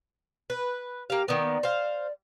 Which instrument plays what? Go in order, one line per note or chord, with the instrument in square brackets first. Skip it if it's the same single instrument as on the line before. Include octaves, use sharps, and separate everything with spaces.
[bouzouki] B4
[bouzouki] A#3 F5 [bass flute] G4
[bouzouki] D#3 A#3 B3 [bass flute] D5
[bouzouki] C5 F5